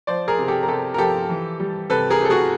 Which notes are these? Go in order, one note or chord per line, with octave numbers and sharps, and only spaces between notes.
F3 C5 D5
G#4 A#4
C3
G4 A4
A#4
C3 G4 A4
A#4
F3 G4 A4
E3
G3
C3 A4 B4
G#4 A#4
C3 A4
F#4 G#4